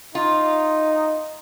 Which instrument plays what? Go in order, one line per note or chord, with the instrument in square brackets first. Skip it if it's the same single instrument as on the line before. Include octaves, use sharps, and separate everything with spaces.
[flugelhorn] D#4 [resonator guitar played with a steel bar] F4